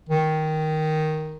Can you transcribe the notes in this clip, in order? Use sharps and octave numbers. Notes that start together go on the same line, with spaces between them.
D#3